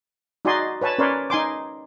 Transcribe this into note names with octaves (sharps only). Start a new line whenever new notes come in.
D#4 F#4 D5 D#5 G#5 C6
B4 C#5 G#5 A5 B5
C#4 A#4 B4 C#5 D5 C6
D#4 G#5 C6 D6